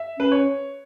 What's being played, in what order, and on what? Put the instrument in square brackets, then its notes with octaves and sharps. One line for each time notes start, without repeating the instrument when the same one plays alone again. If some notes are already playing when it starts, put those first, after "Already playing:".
Already playing: [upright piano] E5
[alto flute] C#4 [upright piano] B4
[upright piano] C#5